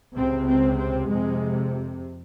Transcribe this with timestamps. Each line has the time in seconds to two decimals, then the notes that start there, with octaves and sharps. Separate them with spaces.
0.15 C#2 C3 C4
0.46 C4
0.77 C4
1.08 F2 C3 G#3